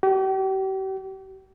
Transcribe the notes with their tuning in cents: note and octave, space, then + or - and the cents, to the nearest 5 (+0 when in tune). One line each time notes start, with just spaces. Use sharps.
G4 -40